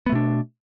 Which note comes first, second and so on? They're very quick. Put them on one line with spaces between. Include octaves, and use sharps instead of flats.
B3 A3 B2 D4